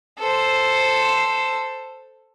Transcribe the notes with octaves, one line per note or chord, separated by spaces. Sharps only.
A4 C5